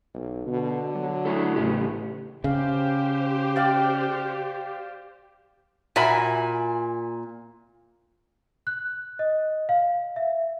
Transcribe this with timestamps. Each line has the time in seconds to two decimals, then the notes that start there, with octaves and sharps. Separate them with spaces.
0.14 B1
0.46 B2 D3
0.95 F#3
1.25 D4 E4 A4
1.56 A1 A2 C#3 G4
2.44 C#3 G4 C5 F5
3.56 D5 F5 G5
5.96 A#2 F#4 E5 G#5 B5
8.67 F#6
9.19 D#5
9.69 F5
10.16 E5